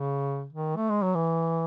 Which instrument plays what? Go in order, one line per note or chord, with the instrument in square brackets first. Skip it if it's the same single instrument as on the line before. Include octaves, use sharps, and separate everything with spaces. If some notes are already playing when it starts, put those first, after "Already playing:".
Already playing: [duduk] C#3
D#3
A3
G#3
F#3
E3